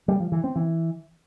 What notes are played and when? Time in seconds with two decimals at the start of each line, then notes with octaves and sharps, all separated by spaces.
0.08 G3
0.20 F3
0.32 E3
0.44 C4
0.56 E3